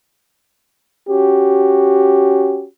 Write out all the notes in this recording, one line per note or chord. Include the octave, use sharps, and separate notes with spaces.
C#4 F#4 G4